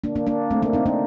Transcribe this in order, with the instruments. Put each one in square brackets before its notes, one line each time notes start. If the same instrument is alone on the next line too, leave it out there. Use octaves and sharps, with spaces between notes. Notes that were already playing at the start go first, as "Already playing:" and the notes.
[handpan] A#3 D4
A#3 D4
A#3 D4
A3 C4
A#3 D4
C4 D#4
A#3 D4